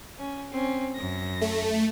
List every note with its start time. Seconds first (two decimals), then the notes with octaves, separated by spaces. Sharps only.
0.19 C#4
0.51 C4 C#4
0.95 F#2 A#6
1.41 A3